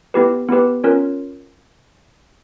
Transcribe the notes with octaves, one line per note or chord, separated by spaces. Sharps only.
B3 E4 G4 B4
B3 E4 G4 B4
C#4 F4 A#4 C#5